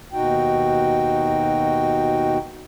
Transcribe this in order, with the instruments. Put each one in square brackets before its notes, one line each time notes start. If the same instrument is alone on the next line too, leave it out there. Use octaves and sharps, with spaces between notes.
[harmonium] D#2 B2 D#4 F#4 G5